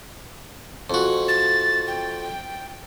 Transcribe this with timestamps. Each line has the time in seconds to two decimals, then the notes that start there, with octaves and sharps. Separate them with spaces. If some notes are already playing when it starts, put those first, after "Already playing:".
0.90 F2 F#4
1.28 A6
1.87 G5